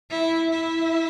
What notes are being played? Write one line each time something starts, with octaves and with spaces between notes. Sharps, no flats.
E4
E4